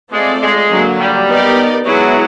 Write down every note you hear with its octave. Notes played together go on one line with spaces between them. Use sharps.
G#3 A3 C4 F4 A4 D5
G#3
D3 F#3 A#3
G3
B3 D#4 G4 A#4 D5
F#3 G#3 B3 E4 G#4